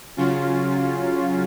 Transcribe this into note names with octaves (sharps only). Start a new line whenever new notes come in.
C#3 F#3 C#4 F4